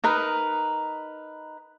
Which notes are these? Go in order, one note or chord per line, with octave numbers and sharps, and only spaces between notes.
D#4 A#4 B4